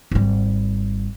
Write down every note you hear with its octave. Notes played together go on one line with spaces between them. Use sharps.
G#1 G3